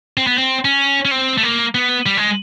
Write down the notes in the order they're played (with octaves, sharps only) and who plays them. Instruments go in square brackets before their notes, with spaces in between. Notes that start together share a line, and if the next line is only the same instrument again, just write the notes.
[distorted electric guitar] C4
B3
C4
C#4
C#4
C4
A3
A#3
B3
G3
G#3